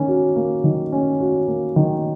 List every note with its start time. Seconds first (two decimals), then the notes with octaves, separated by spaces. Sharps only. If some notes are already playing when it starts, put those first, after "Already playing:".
Already playing: D#3 A#3 C#4
0.08 F#4
0.36 A#3
0.64 D#3
0.92 C#4
1.20 F#4
1.48 A#3
1.76 D#3